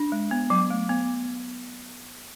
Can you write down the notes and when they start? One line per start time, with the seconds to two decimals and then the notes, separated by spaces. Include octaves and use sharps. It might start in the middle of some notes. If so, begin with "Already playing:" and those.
Already playing: D4
0.12 G#3
0.31 B3
0.50 F#3
0.70 A3
0.89 B3